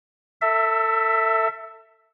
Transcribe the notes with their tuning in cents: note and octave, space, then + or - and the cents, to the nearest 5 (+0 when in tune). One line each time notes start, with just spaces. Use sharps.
A4 +30 E5 +0